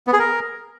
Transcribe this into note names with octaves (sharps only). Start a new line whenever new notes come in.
B3
G#4
A#4